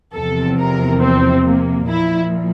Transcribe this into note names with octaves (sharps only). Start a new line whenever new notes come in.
E2 C3 F3 A4
A#4
C4
A#3
A#2 F3 E4